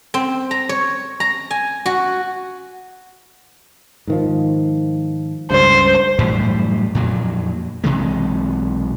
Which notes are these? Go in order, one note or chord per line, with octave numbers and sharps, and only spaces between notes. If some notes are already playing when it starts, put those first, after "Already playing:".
C4
A#5
C#5
A#5
G#5
F#4
G#2 D#3 F3
C#2 G2 C5
F#2 A2 E3 G3
F2 A#2 F#3
B1 C3 E3 G#3